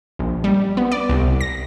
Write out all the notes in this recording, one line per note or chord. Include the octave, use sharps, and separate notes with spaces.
A#1
G3
B3
D5
C2
A#6